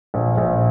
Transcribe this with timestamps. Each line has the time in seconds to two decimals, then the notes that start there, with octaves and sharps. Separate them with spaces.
0.14 A#1
0.38 A#1